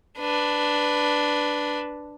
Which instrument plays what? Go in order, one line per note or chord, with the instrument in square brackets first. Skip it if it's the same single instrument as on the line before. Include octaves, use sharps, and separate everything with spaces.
[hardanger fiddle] D4 B4